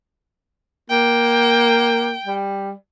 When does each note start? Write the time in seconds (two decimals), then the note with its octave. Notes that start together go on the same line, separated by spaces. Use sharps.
0.90 A#3 G5
2.25 G3